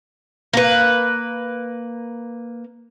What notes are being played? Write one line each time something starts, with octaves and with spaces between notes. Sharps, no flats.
A#3 B4